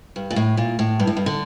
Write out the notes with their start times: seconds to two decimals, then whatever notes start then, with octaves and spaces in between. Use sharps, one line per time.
0.16 G2
0.31 A#2
0.36 A2
0.57 A#2
0.79 A2
1.00 G2
1.07 A2
1.17 G2
1.26 D3